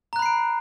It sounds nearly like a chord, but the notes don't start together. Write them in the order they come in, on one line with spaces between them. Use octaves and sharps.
A#5 F#6 B5 C7 D7